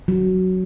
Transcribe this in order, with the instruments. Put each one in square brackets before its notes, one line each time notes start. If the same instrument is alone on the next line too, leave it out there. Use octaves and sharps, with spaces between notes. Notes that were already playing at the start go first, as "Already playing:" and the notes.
[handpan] F#3